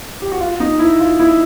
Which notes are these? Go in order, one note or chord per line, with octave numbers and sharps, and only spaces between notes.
G4
F#4
F4
D#4
E4
F4
E4